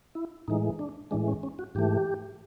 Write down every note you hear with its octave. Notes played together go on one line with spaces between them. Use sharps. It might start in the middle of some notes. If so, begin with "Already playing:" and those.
E4
A2 E3 G#3 D#4
D4
A2 E3 G#3 D4
C#4
C#4
F#4
G#2 E3 A3 G4